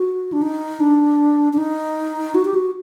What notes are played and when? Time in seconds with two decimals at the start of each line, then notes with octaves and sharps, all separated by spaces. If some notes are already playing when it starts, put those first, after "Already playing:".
Already playing: F#4
0.32 D4
0.42 D#4
0.80 D4
1.53 D4
1.58 D#4
2.35 F#4
2.45 G4
2.54 F#4